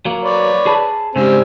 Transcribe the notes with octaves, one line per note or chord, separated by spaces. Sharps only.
F#3 A#3
B4 C#5 D5
G#4 A5 B5
G#2 C#3 G3 C4 G#5